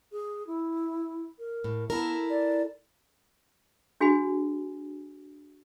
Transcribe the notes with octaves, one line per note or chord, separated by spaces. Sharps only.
G#4
E4
A#4
A2
B3 E4 A4 A#4
D5
D4 F#4 G#4 G#5 B5